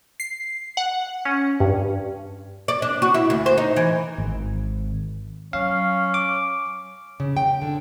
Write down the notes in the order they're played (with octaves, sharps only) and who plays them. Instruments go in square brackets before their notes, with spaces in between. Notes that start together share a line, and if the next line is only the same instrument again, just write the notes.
[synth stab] C7
F#5
C#4
G2
[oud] D5
D4
F#4
E4
D2
C5
D#4
E3
[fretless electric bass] G#1
[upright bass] F#3 [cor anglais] C#4 [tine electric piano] F5
[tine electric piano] D6
[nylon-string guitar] C#3
G5
D3